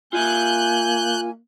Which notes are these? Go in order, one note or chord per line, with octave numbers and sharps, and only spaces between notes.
A#3 F4 D#5 E5 G#5 F#6 G6